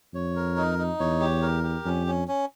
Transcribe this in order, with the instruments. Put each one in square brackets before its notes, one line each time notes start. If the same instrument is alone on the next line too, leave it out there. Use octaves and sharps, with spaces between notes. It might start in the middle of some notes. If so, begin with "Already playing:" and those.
[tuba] F2 [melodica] C#5
[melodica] A#4
D#4
D#4
[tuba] E2 [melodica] C#5
[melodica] G4
A#4
G4
[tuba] F2 [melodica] C#4
[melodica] C#4
C#4